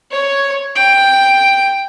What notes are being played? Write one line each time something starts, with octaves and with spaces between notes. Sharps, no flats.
C#5
G5